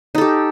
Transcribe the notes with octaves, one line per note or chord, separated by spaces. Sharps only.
D#4 G4 A4